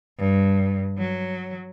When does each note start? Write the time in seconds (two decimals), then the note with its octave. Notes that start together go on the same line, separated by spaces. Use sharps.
0.18 G2
0.98 F#3